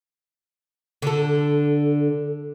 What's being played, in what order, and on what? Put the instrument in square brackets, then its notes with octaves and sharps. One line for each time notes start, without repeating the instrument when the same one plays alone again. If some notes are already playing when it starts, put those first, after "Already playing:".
[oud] D3 A4